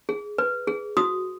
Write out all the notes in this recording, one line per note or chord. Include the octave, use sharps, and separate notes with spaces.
G#4
B4
G#4
F#4 D#6